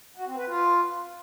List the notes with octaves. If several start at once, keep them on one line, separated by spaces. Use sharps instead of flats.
F#4
C4
B4
F4